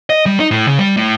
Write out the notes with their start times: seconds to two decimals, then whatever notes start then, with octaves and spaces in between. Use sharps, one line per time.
0.10 D#5
0.26 G3
0.40 D#4
0.51 A2
0.67 C#3
0.79 G3
0.97 A2